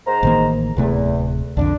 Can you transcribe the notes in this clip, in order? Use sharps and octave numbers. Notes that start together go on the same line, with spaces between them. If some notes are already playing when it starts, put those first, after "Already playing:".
G#2 C5 A#5
A1 D#3 A#3
D1 E2 C3 A3
B1 F2 D3 D4